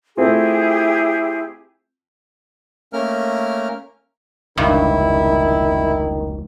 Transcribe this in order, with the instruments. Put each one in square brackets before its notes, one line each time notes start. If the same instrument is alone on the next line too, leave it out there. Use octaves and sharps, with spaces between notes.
[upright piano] A3 C4 F4 [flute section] E4 G4 G#4
[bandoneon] A3 A#3 C#4 A#4 F6
[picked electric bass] F1 C#2 [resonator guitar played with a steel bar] G2 [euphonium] D#3 [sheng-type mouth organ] E4